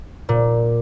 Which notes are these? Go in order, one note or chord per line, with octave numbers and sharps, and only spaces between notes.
A#2